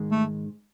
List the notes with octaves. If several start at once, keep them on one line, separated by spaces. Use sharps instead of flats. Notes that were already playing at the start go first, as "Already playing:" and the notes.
Already playing: G#2 D#3 G#3
A3